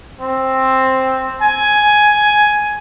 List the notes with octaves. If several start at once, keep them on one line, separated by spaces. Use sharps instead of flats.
C4
G#5